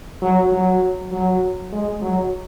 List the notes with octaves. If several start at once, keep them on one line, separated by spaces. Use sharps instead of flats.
F#3
F#3
F#3
G#3
F#3